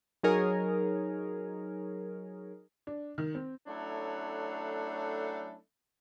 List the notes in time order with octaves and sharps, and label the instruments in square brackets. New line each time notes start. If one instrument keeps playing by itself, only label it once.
[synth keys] F#3 D#4 G#4 A#4 C#5
[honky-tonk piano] D4
D#3
C4
[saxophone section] F#3 A3 C#4 D4 E4 A4